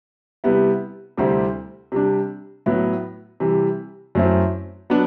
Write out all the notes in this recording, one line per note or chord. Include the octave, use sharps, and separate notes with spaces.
C3 G3 B3 E4
D2 C3 G3 C4 E4
C3 G3 D4
A2 F#3 B3 E4
C3 E3 G3
F#2 F#3 A3 C4 E4
F#3 B3 D4